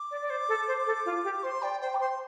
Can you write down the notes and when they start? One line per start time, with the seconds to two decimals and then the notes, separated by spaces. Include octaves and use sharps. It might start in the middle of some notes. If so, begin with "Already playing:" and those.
Already playing: D6
0.11 D5
0.22 D5
0.30 C5
0.49 A4
0.67 C5
0.86 A4
1.05 F4
1.24 G4
1.43 C5 C6
1.62 D5 G5
1.81 C5 G5
1.95 D6
2.00 C5 C6